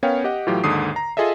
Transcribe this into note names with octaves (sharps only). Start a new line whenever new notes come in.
B3 C#4 A#4 C#5 F5 G5
G4 D#5 F#5
A2 E3 F#3 F4 G4
D#2 G#2 D3 D#6 C7
A#5
F4 G#4 A4 D#5 E5